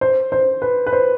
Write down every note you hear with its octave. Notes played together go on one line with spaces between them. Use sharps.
C5
C5
B4
B4
C5